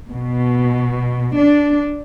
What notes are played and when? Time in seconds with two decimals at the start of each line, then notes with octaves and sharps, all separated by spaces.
0.11 B2
1.37 D4